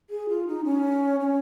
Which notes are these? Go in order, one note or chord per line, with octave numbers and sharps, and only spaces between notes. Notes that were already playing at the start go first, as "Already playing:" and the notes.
G#4
F4
D#4
C#4
C#4